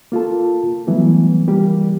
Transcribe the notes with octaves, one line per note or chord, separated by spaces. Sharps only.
A#3 F4 A4 A5
E3 F#3 G3 A3 B3
E3 G3 A#3 G4